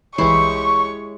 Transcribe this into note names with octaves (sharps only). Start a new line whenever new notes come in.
C2 E3 G#3 E4 G4 C#5 C#6 C7